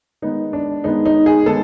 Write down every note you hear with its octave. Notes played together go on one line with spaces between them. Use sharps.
D#3 G#3 B3 D#4
D4
D#3 G#3 B3 D#4
D#4
G#4
D#3 G#3 B3 A4